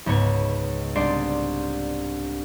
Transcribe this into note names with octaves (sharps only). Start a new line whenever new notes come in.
C#2 G#2 B3 C#5
C2 D4 D5 C6 C7